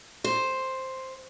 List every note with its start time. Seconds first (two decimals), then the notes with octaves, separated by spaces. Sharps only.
0.24 C5